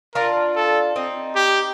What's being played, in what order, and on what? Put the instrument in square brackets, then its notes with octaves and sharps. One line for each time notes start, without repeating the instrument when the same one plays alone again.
[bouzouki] D4 F4 [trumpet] A#4
[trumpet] A4
[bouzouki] C4 D#4
[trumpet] G4